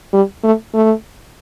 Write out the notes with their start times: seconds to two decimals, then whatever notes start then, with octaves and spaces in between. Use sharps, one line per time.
0.13 G3
0.44 A3
0.74 A3